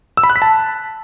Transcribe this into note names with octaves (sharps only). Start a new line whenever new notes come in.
E6
B5
F#6
B6
A5